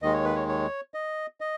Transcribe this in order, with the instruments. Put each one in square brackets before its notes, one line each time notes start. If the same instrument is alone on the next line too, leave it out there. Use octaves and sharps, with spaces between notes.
[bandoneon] D#2 D#3 G#3 D#5
C#5
B4
C#5
C#5
D#5
D#5